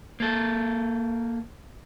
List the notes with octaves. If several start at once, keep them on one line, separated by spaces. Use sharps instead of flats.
A#3 A4